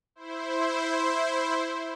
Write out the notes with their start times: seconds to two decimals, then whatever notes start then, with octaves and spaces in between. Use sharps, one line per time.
0.15 E4 C5